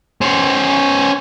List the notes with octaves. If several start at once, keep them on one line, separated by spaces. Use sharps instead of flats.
C#4 C5